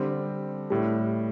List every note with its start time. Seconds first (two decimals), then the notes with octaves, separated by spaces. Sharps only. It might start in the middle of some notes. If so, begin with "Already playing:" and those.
Already playing: D3 G3 C4
0.70 A2 G3